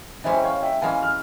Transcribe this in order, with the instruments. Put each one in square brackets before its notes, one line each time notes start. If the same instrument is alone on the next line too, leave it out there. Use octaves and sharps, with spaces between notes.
[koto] E3 G#3 C#4 [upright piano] C5 E5
[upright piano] G5
C#5 F5
E5 G5
[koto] E3 G#3 C#4 [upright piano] F5 G#5
[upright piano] F6